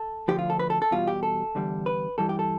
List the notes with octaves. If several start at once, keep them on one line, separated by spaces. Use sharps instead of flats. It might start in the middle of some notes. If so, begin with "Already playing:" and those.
Already playing: A4
D2 D3 F3 G4
F4
A4
B4
A4
A4
E2 B2 G3 F4
G4
A4
E2 D3 G3
B4
G2 E3 G3 A4
G4
A4